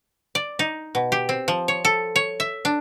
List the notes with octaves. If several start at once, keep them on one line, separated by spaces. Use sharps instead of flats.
D5
D#4
B2
G4
C4
F3
C#5
A4
C#5
E5
D4